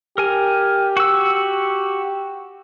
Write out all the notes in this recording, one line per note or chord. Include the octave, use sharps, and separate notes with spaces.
G4 A#4 G#5
F#4 E6